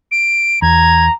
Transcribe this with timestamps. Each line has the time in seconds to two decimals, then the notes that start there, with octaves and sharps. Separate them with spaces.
0.11 D7
0.62 E2 A#5 G#6